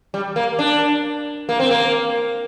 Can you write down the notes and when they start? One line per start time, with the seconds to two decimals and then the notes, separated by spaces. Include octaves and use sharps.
0.14 G3
0.36 A#3
0.59 D4
1.49 A#3
1.60 C4
1.71 A#3